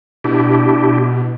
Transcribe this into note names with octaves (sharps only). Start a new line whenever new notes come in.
B2 D4 E4 G4